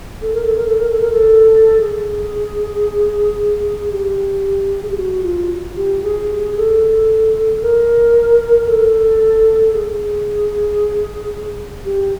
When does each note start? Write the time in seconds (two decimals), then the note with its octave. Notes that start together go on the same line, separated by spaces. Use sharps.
0.22 A4
0.33 A#4
0.44 A4
0.56 A#4
0.66 A4
0.78 A#4
0.89 A4
1.00 A#4
1.11 A4
1.80 G#4
3.92 G4
4.83 G#4
4.90 G4
4.98 F#4
5.24 F4
5.77 G4
6.03 G#4
6.56 A4
7.62 A#4
8.68 A4
9.73 G#4
11.85 G4